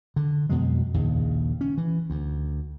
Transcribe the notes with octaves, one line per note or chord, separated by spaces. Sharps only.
D3
F2 B2 F#3 G#3
A#1 D#2 C#3
C#4
E3
D2